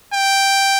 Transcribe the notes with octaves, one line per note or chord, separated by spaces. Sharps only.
G5